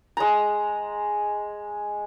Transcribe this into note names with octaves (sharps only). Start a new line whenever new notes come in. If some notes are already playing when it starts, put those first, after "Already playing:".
G#3 A#5